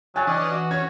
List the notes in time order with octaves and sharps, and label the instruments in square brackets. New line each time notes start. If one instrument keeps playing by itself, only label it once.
[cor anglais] F#3 [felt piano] G#5 F#6 A6
[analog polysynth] E3 [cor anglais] C#4 [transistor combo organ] D4 D#5
[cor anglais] F#4
[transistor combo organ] C#4 [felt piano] G#6